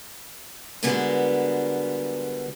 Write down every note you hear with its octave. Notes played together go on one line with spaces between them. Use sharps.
D3 G3 G#3 B3 F#4 A#4